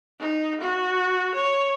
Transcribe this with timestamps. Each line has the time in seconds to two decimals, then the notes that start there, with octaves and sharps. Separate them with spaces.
0.20 D#4
0.61 F#4
1.35 C#5